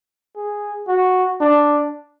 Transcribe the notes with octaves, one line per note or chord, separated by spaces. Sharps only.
G#4
F#4
D4